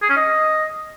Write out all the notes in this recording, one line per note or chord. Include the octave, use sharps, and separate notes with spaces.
G#4
C#4
D#5